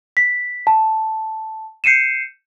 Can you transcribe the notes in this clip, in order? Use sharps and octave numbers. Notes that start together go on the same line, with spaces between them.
B6
A5
G6 C7 C#7 D#7 E7